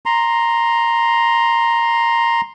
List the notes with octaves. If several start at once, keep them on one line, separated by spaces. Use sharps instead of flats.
A#5 C6